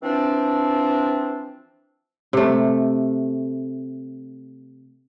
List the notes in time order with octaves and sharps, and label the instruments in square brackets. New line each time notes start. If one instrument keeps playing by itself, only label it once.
[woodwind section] E3 F3 C4 D4
[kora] C3 A3